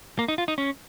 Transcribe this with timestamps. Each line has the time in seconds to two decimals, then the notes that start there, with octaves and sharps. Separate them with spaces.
0.19 A#3
0.28 D#4
0.38 F4
0.48 D#4
0.58 C#4